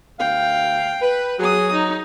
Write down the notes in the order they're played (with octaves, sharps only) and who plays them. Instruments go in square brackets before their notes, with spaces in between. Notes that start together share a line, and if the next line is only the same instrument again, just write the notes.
[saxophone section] D2 F5 [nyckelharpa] G5
[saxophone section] B4
[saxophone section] F#3 [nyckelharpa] G#4 D#6
[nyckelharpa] D#4